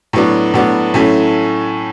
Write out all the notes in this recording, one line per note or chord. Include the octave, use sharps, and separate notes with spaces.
A2 F#3 B3 D4
A2 F#3 B3 D4
A2 F#3 A3 C#4